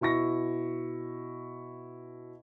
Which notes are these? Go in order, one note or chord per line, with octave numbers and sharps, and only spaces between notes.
B2 E4 C#6 A#6